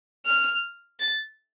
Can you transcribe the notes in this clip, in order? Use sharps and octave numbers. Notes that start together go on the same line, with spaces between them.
F6
A6